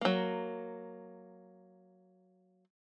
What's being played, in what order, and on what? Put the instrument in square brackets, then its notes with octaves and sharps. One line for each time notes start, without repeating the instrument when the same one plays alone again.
[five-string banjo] F#3 A#3